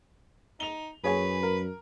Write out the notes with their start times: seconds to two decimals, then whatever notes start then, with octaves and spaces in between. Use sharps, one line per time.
0.60 D#4 F7 G7
1.04 F#2 G#4 B4 C#5 G#5
1.43 A#4